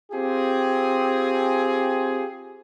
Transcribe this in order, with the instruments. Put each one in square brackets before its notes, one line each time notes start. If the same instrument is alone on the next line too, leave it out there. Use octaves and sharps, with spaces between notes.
[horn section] C4 F4 G4 G#4